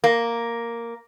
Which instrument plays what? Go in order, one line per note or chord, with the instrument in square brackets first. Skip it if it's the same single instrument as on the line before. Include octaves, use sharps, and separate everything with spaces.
[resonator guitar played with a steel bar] A#3